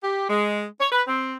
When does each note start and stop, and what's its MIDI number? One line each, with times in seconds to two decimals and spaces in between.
0.02 0.24 67
0.29 0.65 56
0.80 0.88 73
0.91 1.02 71
1.07 1.35 60